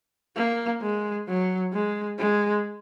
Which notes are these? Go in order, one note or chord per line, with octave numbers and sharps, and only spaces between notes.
A#3
G#3
F#3
G#3
G#3